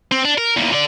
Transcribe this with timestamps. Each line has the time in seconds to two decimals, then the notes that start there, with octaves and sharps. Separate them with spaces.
0.12 C4
0.25 D4
0.38 A#4
0.56 E2 A#3
0.72 D3 D5